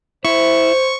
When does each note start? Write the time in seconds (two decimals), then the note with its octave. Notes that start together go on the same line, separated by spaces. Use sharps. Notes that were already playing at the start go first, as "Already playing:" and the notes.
0.25 E4 C5 C#6